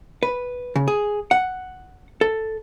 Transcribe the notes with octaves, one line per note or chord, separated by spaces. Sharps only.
B4
C#3
G#4
F#5
A4